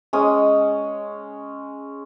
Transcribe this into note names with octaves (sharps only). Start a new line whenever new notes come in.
G#3 C#4 D#6